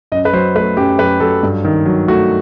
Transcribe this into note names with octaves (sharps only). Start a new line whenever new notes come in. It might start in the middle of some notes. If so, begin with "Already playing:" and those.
F#2 D#5
B4
F#3 C5
A3 B4
F#2 G4
F#2 B4
F#3 A4
G2
D#3
F#3
A3 F#4